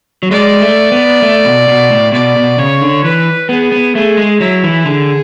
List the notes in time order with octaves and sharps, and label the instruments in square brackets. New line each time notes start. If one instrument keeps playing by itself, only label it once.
[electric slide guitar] F#3
[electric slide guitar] G#3 [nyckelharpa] D5
[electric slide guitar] A3
B3
A3
B2
B2
A2
[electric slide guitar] B2 [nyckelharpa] D5
[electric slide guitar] B2
[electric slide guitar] C#3 [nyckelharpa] C#5
[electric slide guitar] D3
[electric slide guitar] E3 [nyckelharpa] B4
[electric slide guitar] B3 [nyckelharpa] G#4
[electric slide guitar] B3
[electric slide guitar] A3 [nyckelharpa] G#4
[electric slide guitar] G#3
[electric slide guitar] F#3 [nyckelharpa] E4
[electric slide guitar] E3
[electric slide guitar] D3 [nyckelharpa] G#4